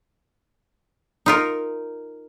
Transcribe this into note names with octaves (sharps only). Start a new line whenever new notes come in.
D#4 F4 A#4